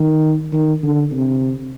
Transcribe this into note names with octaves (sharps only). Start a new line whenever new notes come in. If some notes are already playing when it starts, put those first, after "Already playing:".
Already playing: D#3
D#3
D3
C3